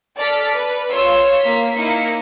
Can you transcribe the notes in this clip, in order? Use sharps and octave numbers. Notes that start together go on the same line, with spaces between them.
A4 D5 F6 B6
B4
F4 C#5 C6 E6
A#3 B6
A#3 D#4 E4 C#7